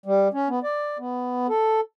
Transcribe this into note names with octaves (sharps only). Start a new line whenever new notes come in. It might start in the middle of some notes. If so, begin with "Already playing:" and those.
G3
C#4
B3
D5
B3
A4